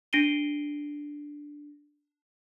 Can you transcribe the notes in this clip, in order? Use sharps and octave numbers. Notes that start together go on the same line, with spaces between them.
D4 A#6 C7 D7 D#7 G7